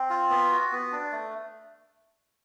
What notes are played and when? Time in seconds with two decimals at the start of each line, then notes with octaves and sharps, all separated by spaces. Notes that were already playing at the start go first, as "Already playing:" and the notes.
Already playing: C4
0.10 F4
0.30 B3
0.51 F#4
0.72 B3
0.92 D4
1.12 A3